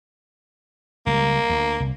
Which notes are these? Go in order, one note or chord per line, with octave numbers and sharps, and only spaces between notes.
C#2 G3 A#3
D2
C2